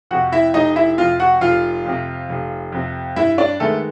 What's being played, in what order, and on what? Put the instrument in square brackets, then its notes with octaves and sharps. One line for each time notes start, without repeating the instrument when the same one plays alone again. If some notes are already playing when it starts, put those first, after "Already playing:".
[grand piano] F2 C3 F#4 F#5
E4 E5
F1 D#4 D#5
E4 E5
F2 C3 F4 F5
F#4 F#5
F1 F4 F5
F2 C3
F1
F2 C3
G2 E4 E5
D4 D5
D#3 G#3 A3 B3 A4